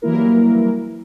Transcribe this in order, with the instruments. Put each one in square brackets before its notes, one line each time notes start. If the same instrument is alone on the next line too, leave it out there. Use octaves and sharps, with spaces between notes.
[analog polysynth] E3 F#3 G3 A#3 E4 A#4